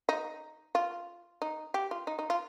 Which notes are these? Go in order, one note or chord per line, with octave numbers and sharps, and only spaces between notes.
D#4
F4
D#4
G4
F4
D#4
D#4
F4